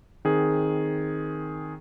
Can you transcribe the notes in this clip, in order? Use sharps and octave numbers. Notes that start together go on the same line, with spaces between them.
D#3 C4 G#4